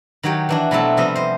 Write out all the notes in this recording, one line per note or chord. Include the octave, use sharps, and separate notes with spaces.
D#3 F#3 G4 C#5 G5
E3 D4 F#4
B2 F#3 A3 C4 E4 A4
C3 F3 G3 B3 D#5 E5
C5 D#5